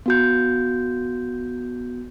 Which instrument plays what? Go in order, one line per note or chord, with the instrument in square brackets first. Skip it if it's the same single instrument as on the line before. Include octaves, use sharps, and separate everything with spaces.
[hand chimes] B3 F#4 G6